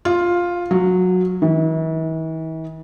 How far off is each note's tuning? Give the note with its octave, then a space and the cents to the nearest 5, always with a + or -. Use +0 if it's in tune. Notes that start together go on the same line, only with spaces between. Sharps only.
F4 +5
F#3 -15
E3 -45